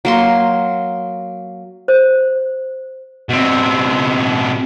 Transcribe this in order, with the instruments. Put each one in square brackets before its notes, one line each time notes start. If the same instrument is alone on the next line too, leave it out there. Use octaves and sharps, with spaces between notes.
[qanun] F#3 A#3 C6
[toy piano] C5
[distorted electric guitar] B2 C4